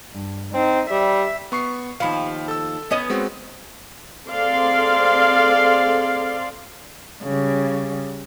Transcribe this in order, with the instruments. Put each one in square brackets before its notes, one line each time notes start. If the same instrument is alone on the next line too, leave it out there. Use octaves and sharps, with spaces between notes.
[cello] G2
[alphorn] C4 [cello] D#4
[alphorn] G3 [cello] E5
[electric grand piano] B3 C#6 C7
[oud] D#2 F3 [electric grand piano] F5 B5
[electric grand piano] A4 E6
[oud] B3 C#4 D#5
[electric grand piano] G#3 C4 F#4
[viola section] C4 G#4 A4 D5 F5 C6
[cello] C#3 G3